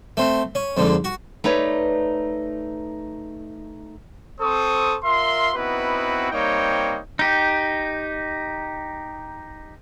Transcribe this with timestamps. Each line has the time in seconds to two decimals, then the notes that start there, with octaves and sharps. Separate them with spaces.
0.17 A3 C4
0.55 C#4
0.77 F2 G#2 D3
1.04 F#4
1.44 A3 D#4 B4 C#5 D5
4.39 C4 A4 C5 C#6 D#6
5.03 F4 A#4 E5 C6
5.55 B3 C4 D#4 E4 F#4 B4
6.31 G3 A#3 C4 D#4 C#5 G5
7.19 D#4 G4